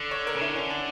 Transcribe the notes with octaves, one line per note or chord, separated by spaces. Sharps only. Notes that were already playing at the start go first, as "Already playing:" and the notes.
Already playing: D3
C#5
A#4
C#3
D3 E4
C#4
D4